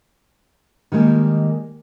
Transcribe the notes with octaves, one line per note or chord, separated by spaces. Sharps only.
D#3 G3 G#3 A#3